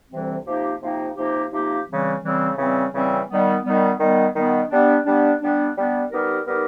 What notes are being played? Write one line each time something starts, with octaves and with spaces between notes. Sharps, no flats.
D2 C3 E3 G3 C4
C3 F3 A#3 D#4 G4
C3 F3 A#3 D#4 G4
C3 F3 A#3 D#4 G4
C3 F3 A#3 D#4 G4
C#3 E3 G3 C4
C#3 E3 G3 C4
C#3 E3 G3 C4
C#3 E3 G3 C4
D#3 G3 B3
D#3 G3 B3
D#3 G3 B3
D#3 G3 B3
G3 B3 D4
G3 B3 D4
G3 B3 D4
G3 B3 D4
G3 B3 D#4 G4 A#4
G3 B3 D#4 G4 A#4